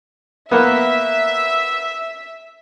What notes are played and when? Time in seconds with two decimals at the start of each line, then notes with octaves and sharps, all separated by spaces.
0.51 A#3 B3 E5